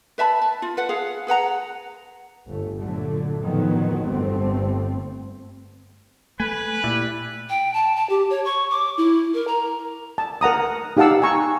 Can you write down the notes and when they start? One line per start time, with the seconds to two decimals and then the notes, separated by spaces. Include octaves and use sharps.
0.18 B4 E5 A5 B5
0.42 A5
0.62 F4
0.77 B4 F#5
0.89 G#4 F5 F#5
1.27 G#4 B4 F#5 A#5
2.48 G1 A3
2.78 A#2 D3 F#3 A3
3.41 F2 A2 D3 D#3 F#3 B3
4.06 G1 G2 G3 A3 B3 C4
6.40 A3 B4 G#5
6.84 A#2 E4 G4 D5
7.50 G5
7.74 A5
7.96 A5
8.10 G4
8.30 C#5
8.45 C#6
8.71 D6
8.98 E4
9.34 A#4
9.47 A#5
10.18 A5
10.41 A#4 F#5 A#5 D#6
10.97 D#4 G4 F5 F#5 A5 E6
11.22 G#5 A#5 C#6 E6